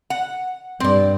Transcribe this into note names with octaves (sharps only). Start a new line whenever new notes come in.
F#5
G2 C4 D5